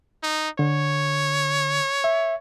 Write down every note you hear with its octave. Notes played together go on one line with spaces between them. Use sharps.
D#4
D3 C#5
E5